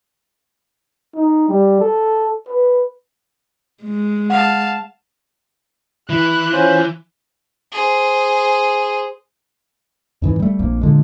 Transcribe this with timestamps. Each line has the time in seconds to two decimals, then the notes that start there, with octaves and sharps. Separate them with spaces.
1.15 D#4
1.49 G3
1.80 A4
2.48 B4
3.83 G#3
4.30 F5 F#5 A5
6.09 E3 E4 F#6
6.52 C#4 F4 C5
7.72 G#4 C5
10.22 F2 G#2 E3
10.40 G3 A3
10.59 A#1 F2 A#3
10.81 A#2 D3 G#3